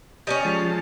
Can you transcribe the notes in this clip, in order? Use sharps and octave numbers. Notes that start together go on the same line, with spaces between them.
G3 A3 C#4 D#5
F3 G#3 A5